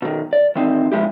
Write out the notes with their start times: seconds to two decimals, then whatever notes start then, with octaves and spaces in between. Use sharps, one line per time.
0.02 B2 D#3
0.33 D5
0.56 D#3 E3 C4 D#4
0.92 B2 F3 G#3 E4 G4